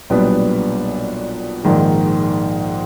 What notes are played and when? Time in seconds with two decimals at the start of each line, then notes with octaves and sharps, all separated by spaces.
0.10 B1 A#2 G3 B3 D4
1.64 A#1 G#2 D#3